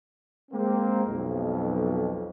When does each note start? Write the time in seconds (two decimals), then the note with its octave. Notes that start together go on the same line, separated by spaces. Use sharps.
0.51 G#3 A#3 C4
1.06 B1 F2